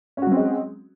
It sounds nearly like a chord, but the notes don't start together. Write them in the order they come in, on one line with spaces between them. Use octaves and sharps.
C#4 F#4 F#3 C4 G#3